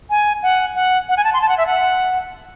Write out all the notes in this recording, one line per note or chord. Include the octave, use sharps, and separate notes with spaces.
G#5
F#5
F#5
F#5
G#5
A5
C6
A5
F#5
E5
F#5